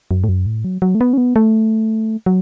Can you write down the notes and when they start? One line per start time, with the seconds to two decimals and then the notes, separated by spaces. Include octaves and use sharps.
0.11 F#2
0.24 A2
0.29 F#2
0.46 A2
0.65 F#3
0.82 F#3
0.95 A3
1.01 B3
1.13 C#4
1.18 B3
1.36 A3
2.26 F#3